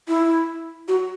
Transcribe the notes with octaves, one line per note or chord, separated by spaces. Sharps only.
E4
F#4